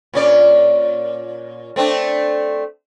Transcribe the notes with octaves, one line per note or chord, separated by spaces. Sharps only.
A#2 C#4 D5
A3 C4 D4